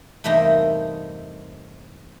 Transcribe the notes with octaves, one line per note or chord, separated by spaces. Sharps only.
E2 G2 C3 A3 A#3 D#4